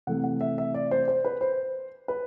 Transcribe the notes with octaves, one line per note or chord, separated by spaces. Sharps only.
C3 E3 A3 F#5
F#5
E5
E5
D5
C5
C5
B4
C5
B4